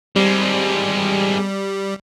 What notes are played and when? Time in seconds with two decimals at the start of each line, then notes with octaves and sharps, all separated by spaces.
0.16 G3 G#3 C4